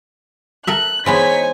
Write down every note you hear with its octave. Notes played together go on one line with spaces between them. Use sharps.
A4 A#4 E5 F#6
E3 G#3 B3 D#4 C5 C#5 G#5 B6